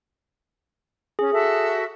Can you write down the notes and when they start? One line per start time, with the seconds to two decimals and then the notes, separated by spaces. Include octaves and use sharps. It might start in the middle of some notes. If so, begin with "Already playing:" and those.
1.19 C#4 G#4
1.32 F#4 A4 E5